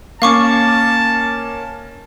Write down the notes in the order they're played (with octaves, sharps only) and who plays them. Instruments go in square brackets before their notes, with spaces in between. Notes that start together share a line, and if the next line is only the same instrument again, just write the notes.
[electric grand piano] A#3 C#4 [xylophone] F5 C#6 D6 [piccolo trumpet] A5